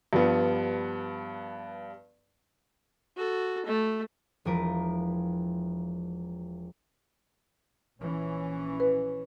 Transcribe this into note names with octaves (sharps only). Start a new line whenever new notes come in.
G2 F3 G3 B3
F#4 A4
A3
E1 F3 A#4 B4
A#1 E3 C#4
B4